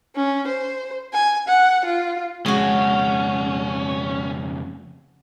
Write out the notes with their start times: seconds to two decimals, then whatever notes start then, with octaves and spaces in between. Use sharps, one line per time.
0.16 C#4
0.48 C5
1.13 G#5
1.48 F#5
1.85 F4
2.46 F2 C#3 G#3 C#4 F#4 G#4